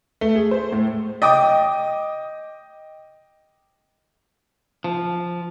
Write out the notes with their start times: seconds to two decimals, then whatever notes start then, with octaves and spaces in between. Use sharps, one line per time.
0.21 A3
0.35 G#4
0.51 C5
0.72 A2
1.22 D#5 G5 D6 D#6
4.84 F3